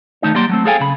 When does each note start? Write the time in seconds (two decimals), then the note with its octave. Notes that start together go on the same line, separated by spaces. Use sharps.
0.22 D#3 A3 D#4 C#5
0.35 F#3 G3 A#3 D5 C6
0.49 F#3 A3 C4
0.65 G#4 A4 C#5 F5 G5 G#5
0.80 C#3 B5